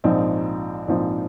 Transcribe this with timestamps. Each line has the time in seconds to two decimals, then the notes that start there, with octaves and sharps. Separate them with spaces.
0.04 A#1 G#2 F3 C4 D#4
0.88 A#1 G#2 F3 C4 D#4